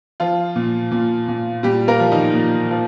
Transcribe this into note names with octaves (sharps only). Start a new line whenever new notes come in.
F3 F4
A#2
A#2
A#2
A#2 G3 G4
A#3 A#4
F3
D#3 D#4
A#2
F3